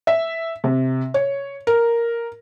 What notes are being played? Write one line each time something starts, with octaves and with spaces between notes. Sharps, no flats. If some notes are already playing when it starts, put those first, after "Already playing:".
E5
C3
C#5
A#4